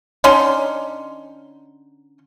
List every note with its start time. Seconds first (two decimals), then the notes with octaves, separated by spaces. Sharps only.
0.24 D3 C#4 D#4 C6